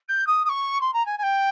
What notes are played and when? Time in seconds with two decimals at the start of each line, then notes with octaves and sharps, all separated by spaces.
0.08 G6
0.27 D#6
0.45 D#6
0.49 C#6
0.81 C6
0.93 A#5
1.05 G#5
1.18 G#5
1.23 G5